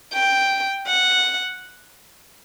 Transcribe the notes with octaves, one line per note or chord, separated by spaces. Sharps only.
G5
F#5